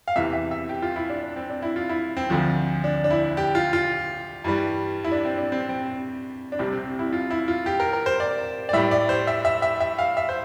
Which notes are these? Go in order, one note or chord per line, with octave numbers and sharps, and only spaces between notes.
F5
E2 C3 E3 E5
E5
E5
G4
F4
E4
D4
D4
C4
D4
E4
F4
E4
C4
D2 D3 F3
D4
D4
E4
G4
F4
F4
G2 E3 G3
E4
D4
C4
D4
C4
C4
D4
C2 C3 G3 C4
C4
E4
F4
E4
F4
G4
A#4
A#4
C5
D5
D5
A2 G3 E5
D5
C5
E5
E5
E5
E5
F5
E5
C5